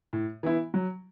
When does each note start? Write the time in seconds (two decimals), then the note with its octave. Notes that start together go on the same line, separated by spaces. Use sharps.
0.13 A2
0.43 E3 B3 E4
0.74 F#3